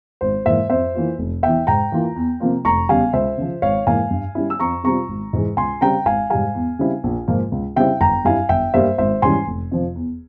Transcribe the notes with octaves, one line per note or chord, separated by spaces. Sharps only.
G#1 C5
G#2 E3 A#3 C5 E5
F2 C5 E5
E3 A#3 F4
F1
E2 E3 E5 G5
G#2 G5 A#5
E3 A#3 F4
E2
C3 F3 A#3 F4
F1 A#5 C#6
E2 C#3 G3 F5 G#5
C#2 C5 E5
C#3 F3
G#1 C#5 F5
G#2 E3 A#3 F5 G#5
G2
G3 C#4 E4
E6
F2 A#5 C#6
C3 G3 C4 F4 A#5 C#6
G#1
G#2 E3 G#3
C#2 G#5 C6
C#3 G3 C4 G5 A#5
G#1 F5 G#5
G#2 G3 F5 G#5
E2
C#3 G3 C4 E4
A#1
G#2 F3 A#3 F4
C#2
C#3 G3 C4 E4 E5 G5
G1 G5 A#5
G2 G3 C4 E4 F5 G#5
G1 E5 G5
G2 G3 A#3 C5 E5
G#1 C5 E5
G#2 E3 G3 C#4 G#5 C6
F1
F2 C3 F3
E2